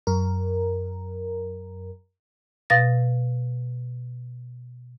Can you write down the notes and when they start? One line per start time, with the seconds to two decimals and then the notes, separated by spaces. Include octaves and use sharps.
0.07 F#2 A#4
2.70 B2 F5 A6 A#6